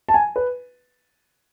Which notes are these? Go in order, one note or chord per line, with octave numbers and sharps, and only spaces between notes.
A5
G#5
B4